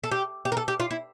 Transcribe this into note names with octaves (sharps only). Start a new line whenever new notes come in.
A4
G4
G4
A#4
A4
G4
F4
E4